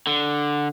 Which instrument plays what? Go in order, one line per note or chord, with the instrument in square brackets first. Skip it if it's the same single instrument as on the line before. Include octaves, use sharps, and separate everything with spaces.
[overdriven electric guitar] D3